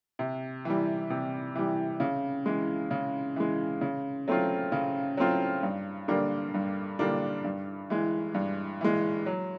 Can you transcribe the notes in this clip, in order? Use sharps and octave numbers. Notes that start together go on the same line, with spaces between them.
C3
E3 G3
C3
E3 G3
C#3
E3 G#3
C#3
E3 G#3
C#3
F#3 A3 C4 F4
C#3
F#3 A3 C4 F4
G2
D3 G3 A#3 D4
G2
D3 G3 A#3 D4
G2
E3 G#3
G2
E3 G#3
F#3